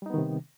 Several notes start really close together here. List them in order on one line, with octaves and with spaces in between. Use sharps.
G3 D#4 B3 D#3 C3